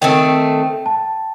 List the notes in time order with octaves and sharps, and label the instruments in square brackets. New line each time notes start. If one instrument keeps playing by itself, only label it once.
[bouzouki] D#3 A3 C4 [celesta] G5
[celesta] A5